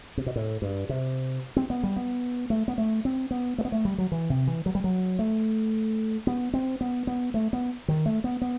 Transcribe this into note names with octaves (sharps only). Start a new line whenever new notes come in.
C3
B2
A2
G2
C3
C4
B3
G3
B3
A3
B3
A3
C4
B3
A3
B3
A3
G3
F#3
E3
C3
E3
F#3
G3
F#3
A3
B3
C4
B3
B3
A3
B3
D#3
A3
B3
B3